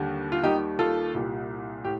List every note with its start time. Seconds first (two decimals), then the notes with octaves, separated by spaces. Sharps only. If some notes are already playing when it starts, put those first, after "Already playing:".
Already playing: D#2 D3 G3
0.32 F4
0.43 D#2 D#3 G3 D#4 G4
0.79 F4 A4
1.14 C2 A#2 G3
1.84 A2 G4